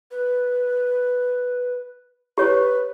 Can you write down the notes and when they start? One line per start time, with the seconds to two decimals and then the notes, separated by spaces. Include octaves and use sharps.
0.11 B4
2.38 G4 B4 C#5